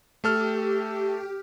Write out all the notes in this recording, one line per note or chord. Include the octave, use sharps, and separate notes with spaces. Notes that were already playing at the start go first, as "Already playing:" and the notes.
A3 G4 A4 F6